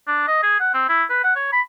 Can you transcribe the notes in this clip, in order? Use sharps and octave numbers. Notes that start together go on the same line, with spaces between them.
D4
D#5
G#4
F#5
C4
E4
B4
F#5
C#5
B5